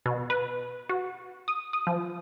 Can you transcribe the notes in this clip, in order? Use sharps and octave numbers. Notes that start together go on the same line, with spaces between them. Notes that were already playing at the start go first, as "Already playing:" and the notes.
B2
B4
F#4
D#6
D#6
F3